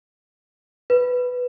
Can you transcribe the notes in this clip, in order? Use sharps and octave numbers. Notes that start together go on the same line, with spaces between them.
B4